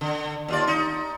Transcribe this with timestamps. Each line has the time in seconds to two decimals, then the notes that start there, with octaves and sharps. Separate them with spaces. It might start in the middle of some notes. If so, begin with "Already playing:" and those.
0.01 D3
0.48 D#2 F4 D5
0.67 D#4